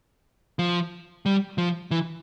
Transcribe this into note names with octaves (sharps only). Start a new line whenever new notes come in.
F3
G3
F3
E3